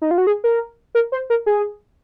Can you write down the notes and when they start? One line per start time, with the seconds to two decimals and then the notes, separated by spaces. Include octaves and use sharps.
0.02 D#4
0.11 F4
0.18 F#4
0.27 G#4
0.44 A#4
0.95 A#4
1.12 C5
1.30 A#4
1.46 G#4